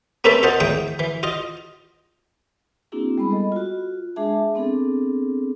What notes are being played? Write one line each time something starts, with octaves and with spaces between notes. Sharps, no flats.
A#3 C4 C#4 A4 B4 E5
F4 C5 D#5 F#5 A5
E2 A2 G5 D#6
E3
F4 D#5
A#3 C4 D4 E4 F#4 G#4
G3 G#3 B3 B5
A4 D#5
F4 F#4
G#3 D4 G#4 E5 A5
B3 C4 D4 G#4 A4